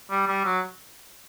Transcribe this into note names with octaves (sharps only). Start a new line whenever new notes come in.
G3
G3
F#3